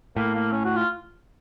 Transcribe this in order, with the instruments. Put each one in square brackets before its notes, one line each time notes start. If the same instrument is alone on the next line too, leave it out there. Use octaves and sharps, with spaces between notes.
[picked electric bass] A2 [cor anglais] A#3
[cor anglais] A#3
C#4
F#4
F4